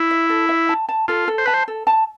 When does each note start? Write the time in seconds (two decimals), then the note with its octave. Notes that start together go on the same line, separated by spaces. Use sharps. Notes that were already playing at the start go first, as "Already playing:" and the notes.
Already playing: E4
0.11 E5
0.29 A4
0.49 E5
0.69 A5
0.89 A5
1.08 F4 A4
1.28 A4
1.38 C5
1.46 B4 A5
1.54 C5
1.68 A4
1.87 A5